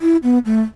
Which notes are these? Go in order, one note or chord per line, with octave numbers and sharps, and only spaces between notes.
E4
B3
A3